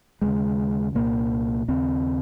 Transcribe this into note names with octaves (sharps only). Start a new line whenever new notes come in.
D#2 C#3 G#3
C2 A#2 A#3
D#2 C#3 C4